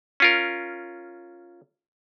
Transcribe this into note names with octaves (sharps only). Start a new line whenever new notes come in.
C#4 F4 A#4